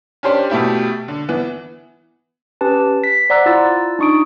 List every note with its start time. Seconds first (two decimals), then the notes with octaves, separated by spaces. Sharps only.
0.23 C#4 D4 G4 C5 D5
0.50 B2 A3 E4 G4
1.08 D3
1.29 E3 B3
2.61 C#4 G4 B4 A5
3.04 B6
3.30 C5 D5 F#5 A#5 E6 F#6
3.46 E4 F4 E6 A6
3.99 D4 D#4 C#6 D#6 D7